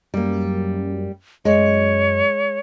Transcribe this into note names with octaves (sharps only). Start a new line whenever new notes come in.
F#2 G3 A#3
F#2 G#3 C#5